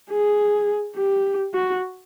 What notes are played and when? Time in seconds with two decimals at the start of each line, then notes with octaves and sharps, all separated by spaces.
0.11 G#4
0.96 G4
1.54 F#4